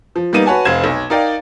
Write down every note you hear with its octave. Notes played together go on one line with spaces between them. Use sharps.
F3
G3 A#3 B3 D#4 D#7
F#4 B4 C#5 F#5 G#5 A5
F1 C5 F5 G#6 E7
B1
D#4 A#4 D5 F5 G5